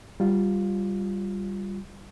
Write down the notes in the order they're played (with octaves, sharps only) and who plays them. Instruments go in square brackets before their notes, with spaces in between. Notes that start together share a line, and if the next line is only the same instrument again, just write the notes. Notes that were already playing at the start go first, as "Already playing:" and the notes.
[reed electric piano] G3 F4